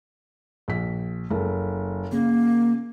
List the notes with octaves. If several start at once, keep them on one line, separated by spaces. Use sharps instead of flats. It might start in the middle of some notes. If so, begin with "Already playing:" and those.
A#1 B6
F#1 A4 A#4
C#3 A#3